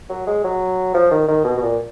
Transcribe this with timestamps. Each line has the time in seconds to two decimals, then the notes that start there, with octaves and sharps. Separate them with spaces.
0.10 F#3
0.27 G#3
0.44 F#3
0.94 F3
1.11 D#3
1.28 D#3
1.44 B2
1.57 B2
1.62 A#2